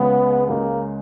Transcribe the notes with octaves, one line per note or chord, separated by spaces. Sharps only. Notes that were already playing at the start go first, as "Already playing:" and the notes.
Already playing: C#2 C#3 G#3 B3
C#2 C#3 G#3 A#3